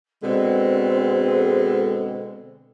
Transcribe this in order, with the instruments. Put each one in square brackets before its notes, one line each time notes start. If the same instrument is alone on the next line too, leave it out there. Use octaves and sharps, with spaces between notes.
[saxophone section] B2 D3 G#3 [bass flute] C4 [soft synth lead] A4